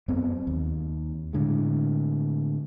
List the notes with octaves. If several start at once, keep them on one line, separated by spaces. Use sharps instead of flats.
F#2 B3 C4
D#2
A2 D3 G#3